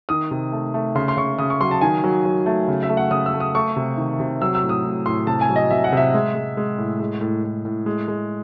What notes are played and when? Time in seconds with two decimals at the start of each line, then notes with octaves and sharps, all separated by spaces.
0.09 D#3 D#6
0.31 C3
0.52 A3
0.74 A3
0.95 C#3 C6
1.08 C6
1.17 C#3 C#6
1.38 C#3 D#6
1.50 C#6
1.61 F#3 C6
1.71 A5
1.81 D#3 G#5
2.04 F#3
2.25 F#3
2.46 A3
2.68 C#3
2.83 E5
2.89 A3
2.97 F#5
3.11 C#3 D#6
3.26 E6
3.34 A3
3.40 D#6
3.55 A3 C#6
3.76 C3
3.97 D#3
4.20 C3
4.42 F#3 E6
4.55 E6
4.63 A2
4.69 D#6
4.84 A2
5.05 A2 C6
5.27 C3 A5
5.41 G#5
5.49 F#3
5.56 D#5
5.71 C3 E5
5.84 F#5
5.92 C3 E5
6.14 G#3
6.35 G#3
6.57 G#3
6.78 A2
7.00 G#3
7.21 A2
7.44 A2
7.65 A2
7.86 G#3
8.08 G#3